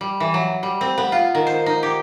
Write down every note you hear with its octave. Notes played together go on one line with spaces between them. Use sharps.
G3
E3
F#3
G3
C4
B3
F4
D#3
C5
D#4
G4